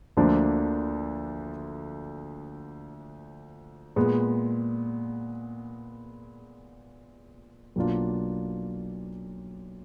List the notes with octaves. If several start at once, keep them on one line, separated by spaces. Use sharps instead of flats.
D2 D3 F3 A#3 D4
A#2 G#3 B3
B1 B2 A#3 D4 F4